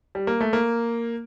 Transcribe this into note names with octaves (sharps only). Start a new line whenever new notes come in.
G3
A#3
A3
A#3